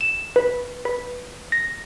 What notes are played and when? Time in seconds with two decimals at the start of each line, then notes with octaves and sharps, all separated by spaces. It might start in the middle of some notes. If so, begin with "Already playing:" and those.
0.01 E7
0.36 B4
0.85 B4
1.52 A#6